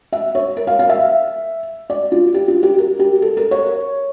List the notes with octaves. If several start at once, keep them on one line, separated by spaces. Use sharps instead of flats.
E5
C#5
A#4
F5
F5
E5
D5
F4
G4
F4
G4
A#4
G4
A4
A#4
C#5